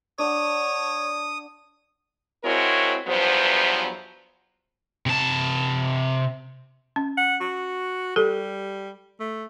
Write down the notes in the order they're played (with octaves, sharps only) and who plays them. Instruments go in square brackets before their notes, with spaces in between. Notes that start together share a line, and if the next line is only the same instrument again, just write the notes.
[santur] D4 F#5 [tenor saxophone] C#5 [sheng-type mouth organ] D#6
[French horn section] G#3 C4 E4 F#4 A#4 C#5
E2 G2 F3 F#3 B3 C5
[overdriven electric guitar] C3 A5
[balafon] C#4
[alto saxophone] F#5
F#4
[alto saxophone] G3 [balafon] G4 A4
[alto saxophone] A3